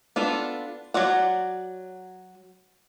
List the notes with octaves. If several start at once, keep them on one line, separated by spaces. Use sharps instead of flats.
B3 D4 F4 A4
F#3 F#4 D5 F#5